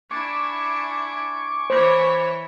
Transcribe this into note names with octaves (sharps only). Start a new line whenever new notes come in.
D4 E4 G#5 C#6 D6
E3 C5 C#5